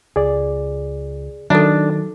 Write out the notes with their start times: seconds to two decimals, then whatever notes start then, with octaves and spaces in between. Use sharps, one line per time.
0.16 C#2 G#4 D5
1.50 D#3 F#3 D4 A4 E5